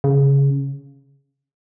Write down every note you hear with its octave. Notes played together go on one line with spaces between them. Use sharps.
C#3